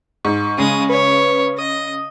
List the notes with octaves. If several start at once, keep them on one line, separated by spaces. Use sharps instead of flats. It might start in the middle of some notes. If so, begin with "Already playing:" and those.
G#2 C#6
C#3 G#3 D#6
B4 C#5
D#5 D#6